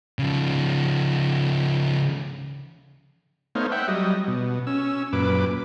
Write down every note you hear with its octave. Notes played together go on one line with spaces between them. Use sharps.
C#3 F3
A3 B3 D#4 C5 C#5 F5
E5 F#5 G5
F#3 G3 D#5
B2
C#4 E6
F#2 A#2 B4 D6